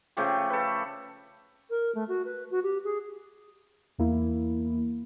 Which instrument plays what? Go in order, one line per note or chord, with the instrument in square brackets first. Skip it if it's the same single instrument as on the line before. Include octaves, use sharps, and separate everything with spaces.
[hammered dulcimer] C#3 F3 A3 G4
A4 B4
[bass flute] A#4
A3
F#4
B4
F#4
G4
G#4
[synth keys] E2 A#3 E4